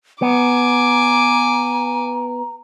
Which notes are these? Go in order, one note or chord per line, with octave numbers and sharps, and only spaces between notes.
B3 G#5 A#5 D6